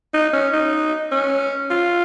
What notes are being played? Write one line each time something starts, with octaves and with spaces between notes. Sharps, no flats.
D#4
C#4
D#4
C#4
F4